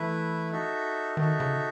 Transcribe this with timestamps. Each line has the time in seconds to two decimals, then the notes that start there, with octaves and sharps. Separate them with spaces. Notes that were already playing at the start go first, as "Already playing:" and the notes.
Already playing: E3 A3 E4 B4 E5
0.51 D#4 F#4 A4 E5
1.17 D#3 D#4 F#4 A4 E5
1.40 C#3